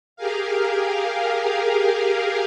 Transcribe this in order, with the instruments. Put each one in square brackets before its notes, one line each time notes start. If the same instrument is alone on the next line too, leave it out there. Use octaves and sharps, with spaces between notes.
[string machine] G4 G#4 A#4 F5